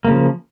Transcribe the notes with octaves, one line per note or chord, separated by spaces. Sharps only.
C#3 F3 A#3